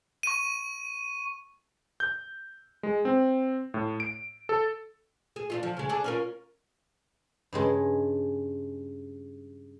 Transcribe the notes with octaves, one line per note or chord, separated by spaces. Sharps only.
C#6 D#7
G6
G#3
C4
A2
D7
A4
G#4
D4 E4 F4
F3
C#3 G#3
D4 G#4 A4
C#4 F4 A#4
G2 C#3 G#3